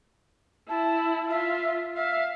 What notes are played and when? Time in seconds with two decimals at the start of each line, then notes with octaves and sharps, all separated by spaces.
0.69 E4 A5
1.30 F4 E5
1.96 E5 F5